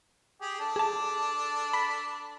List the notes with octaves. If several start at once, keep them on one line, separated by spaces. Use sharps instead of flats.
G4 G#4
D4 A4
G#4 A5
B5 B6